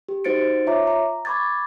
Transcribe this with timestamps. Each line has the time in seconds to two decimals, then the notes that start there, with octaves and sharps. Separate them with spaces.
0.09 G4
0.24 D#4 F#4 C5 A6 C#7 D7
0.67 F4 C#5 E5 A#5 D6
0.87 A#5
1.25 B5 C#6 D6 G#6 A6